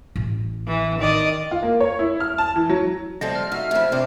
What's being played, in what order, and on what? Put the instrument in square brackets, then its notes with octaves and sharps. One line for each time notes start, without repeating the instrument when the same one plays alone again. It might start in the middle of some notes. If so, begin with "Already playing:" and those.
[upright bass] A1
[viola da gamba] E3
D#3 D5 D#5
[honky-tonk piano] F4
A#3
C#5
E4
F6
A5
E3
F#3
[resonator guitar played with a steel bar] F3 A3 [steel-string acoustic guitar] G3 C4 A4 [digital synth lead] D#5
[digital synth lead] F6
[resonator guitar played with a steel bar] D#4 [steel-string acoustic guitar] F#4 [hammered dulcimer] E5 F5
[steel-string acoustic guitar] A2 F3 [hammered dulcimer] C3 [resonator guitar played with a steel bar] E4 E5
[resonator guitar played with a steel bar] C3 D4 [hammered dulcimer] A3 [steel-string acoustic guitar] C5